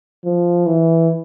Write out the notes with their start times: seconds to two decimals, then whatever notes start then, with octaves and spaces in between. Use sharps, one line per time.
0.25 F3
0.66 E3